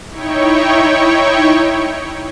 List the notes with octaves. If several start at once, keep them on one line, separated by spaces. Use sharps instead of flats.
D#4 E4 C#5 G5 C#6